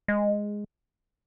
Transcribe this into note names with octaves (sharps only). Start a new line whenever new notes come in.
G#3